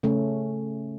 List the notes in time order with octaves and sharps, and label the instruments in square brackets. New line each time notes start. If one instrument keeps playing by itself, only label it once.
[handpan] C#3 A3 C#4